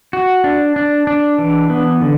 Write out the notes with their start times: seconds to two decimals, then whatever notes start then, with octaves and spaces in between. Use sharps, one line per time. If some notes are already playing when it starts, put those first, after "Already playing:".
0.13 F#4
0.44 D4
0.76 D4
1.07 D4
1.39 E3
1.70 B3
2.02 D3